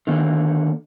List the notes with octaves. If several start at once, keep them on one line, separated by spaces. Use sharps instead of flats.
D3 D#3 A#3